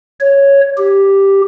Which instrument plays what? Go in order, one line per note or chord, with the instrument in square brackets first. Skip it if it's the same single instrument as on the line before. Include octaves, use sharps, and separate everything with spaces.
[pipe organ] C#5
G4